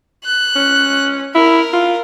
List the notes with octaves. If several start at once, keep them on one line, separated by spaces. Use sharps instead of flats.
F#6
C#4
E4 A#4
F4